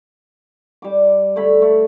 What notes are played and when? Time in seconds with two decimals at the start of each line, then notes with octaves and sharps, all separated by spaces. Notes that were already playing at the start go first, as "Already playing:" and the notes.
0.82 G3 D6
1.36 D3 A3 C#5 B5
1.62 A3